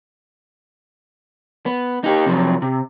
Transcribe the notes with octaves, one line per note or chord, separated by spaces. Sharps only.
B3
D#4 G4
C3 F3 F#3
C3